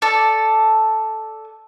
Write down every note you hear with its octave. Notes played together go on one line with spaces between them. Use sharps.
A4 D5